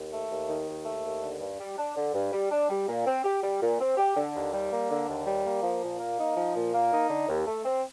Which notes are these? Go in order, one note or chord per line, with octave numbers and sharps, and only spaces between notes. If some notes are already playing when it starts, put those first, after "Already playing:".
Already playing: D#2
A3
D#2
D#3
D#2
A3
D#2
D3
G2
G3
D4
D3
G2
G3
D4
G3
A#2
C4
G4
G3
A#2
C4
G4
D3
D#2
G3
A#3
D3
D#2
G3
A#3
F3
A#2
A#3
D#4
F3
A#2
A#3
D#4
D3
D#2
A3
C4